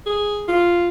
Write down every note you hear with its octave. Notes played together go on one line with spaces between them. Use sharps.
G#4
F4